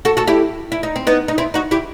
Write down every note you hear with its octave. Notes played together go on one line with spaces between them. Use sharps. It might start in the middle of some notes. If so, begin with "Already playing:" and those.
F#4 A4
F#4 A4
E4 G4
E4
D#4
C4
B3 D#4
D#4
C4 E4
D#4 F#4
E4 G4